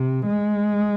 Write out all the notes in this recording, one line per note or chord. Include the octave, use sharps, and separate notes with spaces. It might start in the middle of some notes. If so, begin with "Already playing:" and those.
Already playing: C3
G#3